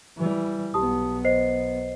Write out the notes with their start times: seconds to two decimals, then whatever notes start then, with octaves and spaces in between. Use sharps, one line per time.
0.17 E3 G3
0.74 B1 B3 G4 A5 D#6
1.25 C5 D#5 C7